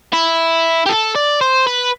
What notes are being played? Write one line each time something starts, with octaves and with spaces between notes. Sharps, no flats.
E4
G4
A4
D5
C5
B4